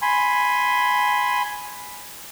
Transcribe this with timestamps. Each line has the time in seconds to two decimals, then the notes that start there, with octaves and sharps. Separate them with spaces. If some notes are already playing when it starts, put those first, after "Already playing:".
0.02 G#5 B5 C6